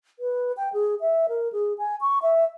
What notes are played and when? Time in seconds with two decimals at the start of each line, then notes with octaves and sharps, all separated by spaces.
0.19 B4
0.57 G5
0.73 G#4
1.01 E5
1.29 A#4
1.52 G#4
1.78 G#5
2.01 C#6
2.22 E5